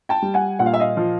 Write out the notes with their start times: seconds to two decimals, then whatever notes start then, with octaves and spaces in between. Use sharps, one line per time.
0.09 G5 A5
0.22 G3
0.34 F#5 G#5
0.59 A#2 F#5
0.66 F5
0.74 E5
0.80 D#5 F5
0.97 F3